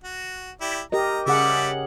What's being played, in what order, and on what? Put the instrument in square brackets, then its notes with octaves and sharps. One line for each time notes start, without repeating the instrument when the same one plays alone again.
[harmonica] F#4
E4 G4 D5
[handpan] G4 A#4 D#5 [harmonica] A#5
[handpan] C#3 G#4 F#5 [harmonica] G3 E5 D6